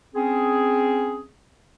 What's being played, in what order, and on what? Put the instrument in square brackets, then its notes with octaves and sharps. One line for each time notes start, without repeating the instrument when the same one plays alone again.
[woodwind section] C4 C#4 G#4